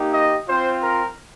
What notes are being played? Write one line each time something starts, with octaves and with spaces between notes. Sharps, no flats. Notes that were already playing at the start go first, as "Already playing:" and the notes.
Already playing: A#3 D#4 G4
D#5
C4 F4 C5
A#4